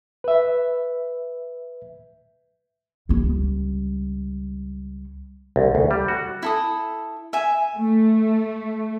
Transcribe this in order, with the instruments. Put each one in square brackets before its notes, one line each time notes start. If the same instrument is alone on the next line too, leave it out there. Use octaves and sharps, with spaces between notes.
[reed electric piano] B4 E5
[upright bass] C#2 G3
[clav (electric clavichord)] C2
D2
G3
F#4
[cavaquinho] E4 A4 D#6
E5 G#5
[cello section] A3